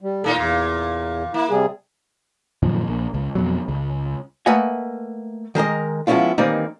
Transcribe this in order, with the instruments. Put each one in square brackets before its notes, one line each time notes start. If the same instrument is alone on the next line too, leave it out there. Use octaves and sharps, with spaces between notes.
[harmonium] G3
[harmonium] A#2 A4 [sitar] A#3 D#4 F4
[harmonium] E2 [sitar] A#2
[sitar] A#3 [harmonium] E4
[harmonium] C3 G3 G#4
[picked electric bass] F#2 A#2 D#3 F3
A#1
C#2
F2 B2 F#3
C#2
[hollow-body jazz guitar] A3 A#3 B4 D#5 F#5 G#5
D#3 G#3 A#4 D#5
F3 G#3 B3 C#4 E4 F4
D#3 E3 G3 A#3 C4 D#4